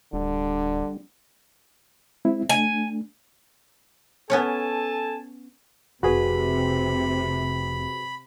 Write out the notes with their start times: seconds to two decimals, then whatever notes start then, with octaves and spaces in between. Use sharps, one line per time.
0.13 D1 D3 G3 D4
2.25 G#3 C4 E4
2.49 A3 D4 G#5
4.30 B3 C#4 A4 C#5 G#5 A5
6.03 F1 C3 F#4 G#4 B4 B5